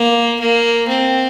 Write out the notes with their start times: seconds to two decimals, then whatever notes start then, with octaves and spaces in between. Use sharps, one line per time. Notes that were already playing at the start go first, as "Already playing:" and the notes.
Already playing: A#3
0.40 A#3
0.88 C4